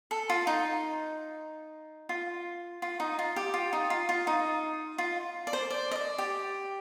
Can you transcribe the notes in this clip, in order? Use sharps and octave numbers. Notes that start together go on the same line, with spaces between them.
A4
F4
D#4
F4
F4
D#4
F4
G4
F4
D#4
F4
F4
D#4
F4
D5
C5
D5
D#5
D5
G4